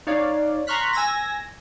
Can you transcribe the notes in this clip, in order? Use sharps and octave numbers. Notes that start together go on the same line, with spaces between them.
D#4 C#5 D5 F5
A#5 C6 C#6 F6 F#6 B6
G#5 E6 G#6 A#6